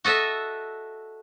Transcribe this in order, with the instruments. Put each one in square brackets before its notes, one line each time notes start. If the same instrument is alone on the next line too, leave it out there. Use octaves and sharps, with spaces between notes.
[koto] F#4 A4 D#5 E5